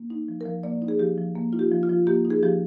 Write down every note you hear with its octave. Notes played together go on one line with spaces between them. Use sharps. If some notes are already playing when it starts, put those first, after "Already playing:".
Already playing: A#3
D#4
F3
A#4
F3
A#3 D5
D#4
G#4
F3 G4
F3
A#3
D#4 F4
G4
F3
F4
F3
A#3 G4
D#4
G#4
F3 G4